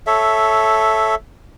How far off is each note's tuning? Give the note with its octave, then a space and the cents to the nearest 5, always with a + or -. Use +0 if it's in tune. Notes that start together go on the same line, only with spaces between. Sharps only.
A4 -10 C#5 +0 E5 +0